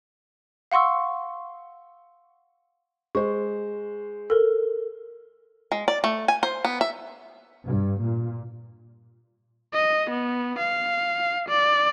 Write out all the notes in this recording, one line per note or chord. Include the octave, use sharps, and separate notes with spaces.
F5 F#5 C6 C#6 E6
G#3 C5 C#6
A4 A#4
G#3
D5
A3
G#5
C5
B3
E5
G2
A#2
D#5
B3
F5
D5